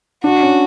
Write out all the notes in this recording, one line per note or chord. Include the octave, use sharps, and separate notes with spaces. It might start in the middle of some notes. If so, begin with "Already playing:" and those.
D4 F#4
C#4